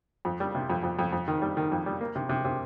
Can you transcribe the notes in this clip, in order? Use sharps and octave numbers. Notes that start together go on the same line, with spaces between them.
F2
G3
C3
F2
F2
F2
F2
D#3
G3
D#3
F2
G3
A#3
C3
C3
C3